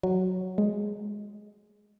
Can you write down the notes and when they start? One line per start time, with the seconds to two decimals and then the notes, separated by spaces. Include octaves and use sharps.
0.03 F#3
0.58 G#3